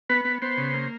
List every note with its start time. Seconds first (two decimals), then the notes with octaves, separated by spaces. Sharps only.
0.10 B3 B4
0.25 B3
0.42 B3 C5
0.57 C#3
0.74 A#3